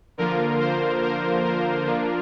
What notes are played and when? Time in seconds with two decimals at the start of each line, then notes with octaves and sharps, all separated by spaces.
0.18 D3 F3 A#3 F4 A#4
0.60 C5
1.03 A#4
1.45 A#4
1.87 F3 A#3 D4 F4